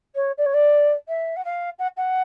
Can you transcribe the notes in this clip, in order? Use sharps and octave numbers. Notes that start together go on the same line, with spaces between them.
C#5
D5
C#5
D5
E5
F#5
F5
F#5
F#5